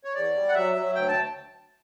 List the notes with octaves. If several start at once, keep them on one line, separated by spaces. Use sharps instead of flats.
C#5
E2 D5
G3
F#5
F#3 E5
F#3
D2 G5
A5